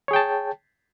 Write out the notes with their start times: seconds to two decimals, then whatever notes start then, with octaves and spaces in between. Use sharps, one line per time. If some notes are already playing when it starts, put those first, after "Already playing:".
0.08 C#5
0.11 G#4
0.13 G5
0.16 A5